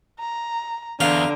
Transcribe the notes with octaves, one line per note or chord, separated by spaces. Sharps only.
A#5
E2 D3 F5 A#5